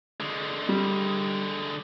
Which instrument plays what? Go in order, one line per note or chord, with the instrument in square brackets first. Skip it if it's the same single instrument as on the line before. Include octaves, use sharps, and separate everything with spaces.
[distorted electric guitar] D3 G#3
[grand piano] G3